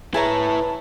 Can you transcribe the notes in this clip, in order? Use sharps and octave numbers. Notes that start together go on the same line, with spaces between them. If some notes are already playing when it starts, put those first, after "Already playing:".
E4 G#4 B4 C#5 E5 A5 A#5